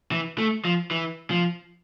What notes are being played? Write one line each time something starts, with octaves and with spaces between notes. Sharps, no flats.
E3
A3
F3
E3
F3